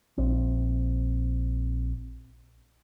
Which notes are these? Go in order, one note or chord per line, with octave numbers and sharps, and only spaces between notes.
A#1 C4